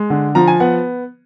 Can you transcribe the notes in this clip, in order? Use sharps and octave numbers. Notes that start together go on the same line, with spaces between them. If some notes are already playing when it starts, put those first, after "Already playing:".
Already playing: G#3
D3
F3 A#5
G#5
B3 F#5